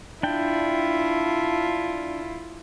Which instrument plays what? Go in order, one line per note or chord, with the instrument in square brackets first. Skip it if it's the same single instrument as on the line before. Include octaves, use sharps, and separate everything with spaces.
[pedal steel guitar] D4 G5 [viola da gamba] E4 F4